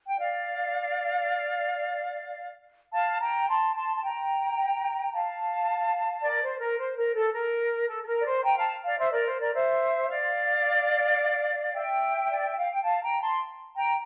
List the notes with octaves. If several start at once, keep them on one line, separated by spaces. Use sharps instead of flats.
G5
D5 F5
F5 A5
G5 A#5
A5 C6
A5 C6
A5
G5 A#5
F5 A5
A#4 D5
C5
A#4
C5
A#4
A4
A#4
A4
A4
A#4
D5
C5
C6
G5 A#5
F5 A5
D5 F5
C5 E5
A#4 D5
C5
A#4 D5
C5 E5
D5 F5
E5 G5
D5
E5
F5
G5
F5 A5
G5 A#5
A5 C6
G5 A#5